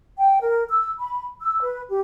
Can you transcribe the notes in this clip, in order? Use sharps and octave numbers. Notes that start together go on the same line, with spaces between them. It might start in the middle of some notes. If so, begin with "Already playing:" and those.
G5
A#4
E6
B5
E6
B4
G4